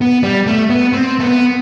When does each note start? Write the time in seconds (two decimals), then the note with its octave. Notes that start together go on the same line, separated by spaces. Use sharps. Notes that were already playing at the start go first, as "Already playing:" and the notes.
0.01 B3
0.23 G3
0.47 A3
0.70 B3
0.93 C4
1.20 A3
1.23 B3